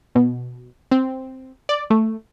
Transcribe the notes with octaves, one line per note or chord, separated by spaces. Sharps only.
B2
C4
D5
A3